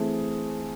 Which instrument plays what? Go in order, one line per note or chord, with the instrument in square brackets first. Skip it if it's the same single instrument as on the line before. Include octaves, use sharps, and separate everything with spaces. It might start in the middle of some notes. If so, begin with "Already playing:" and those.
Already playing: [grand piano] E3 A3 C4 G#4